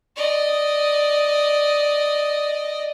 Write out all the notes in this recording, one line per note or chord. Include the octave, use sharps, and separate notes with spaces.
D5 D#5